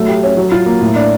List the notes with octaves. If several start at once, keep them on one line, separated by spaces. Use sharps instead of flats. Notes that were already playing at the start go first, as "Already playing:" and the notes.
Already playing: F#3 A3
G4
C#4
F#3
F4
A#3
A2
D4